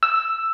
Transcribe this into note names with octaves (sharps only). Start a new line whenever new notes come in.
E6